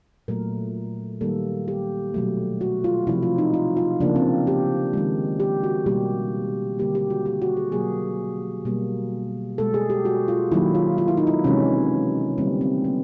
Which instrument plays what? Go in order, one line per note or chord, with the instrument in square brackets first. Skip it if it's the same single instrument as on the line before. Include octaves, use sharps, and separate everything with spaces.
[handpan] A#2 F#3 A3 A#4
D#3 G3 A#3 A4
G4
B2 F#3 A3
F#4
F4
C3 F3 A3 E4
F4
D#4
F4
F4
C#3 F3 A#3 D4
C4
G4
D#3 G#3
G4
F#4
B2 G3 A#3 G4
D3 G3 A#3 G4
G4
F#4
G4
F#4
G#4
B2 F#3 A#3 G#4
B2 G3 A#3
B2 G#3 A4
G#4
G4
F#4
F4
D#3 F#3 A#3 E4
F4
F4
E4
D#4
E4
C3 E3 G#3 C#4
D3 G3 A#3 C4
C4
B3